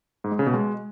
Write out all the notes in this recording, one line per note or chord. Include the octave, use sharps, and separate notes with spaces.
G#2
G#3
C#3
B2
G#3